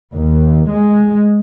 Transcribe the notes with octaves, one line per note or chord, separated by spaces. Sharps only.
D#2
G#3